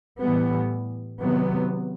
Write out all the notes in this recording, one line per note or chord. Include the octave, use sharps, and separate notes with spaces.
A2 E3 G3 B3
C3 D#3 F#3 B3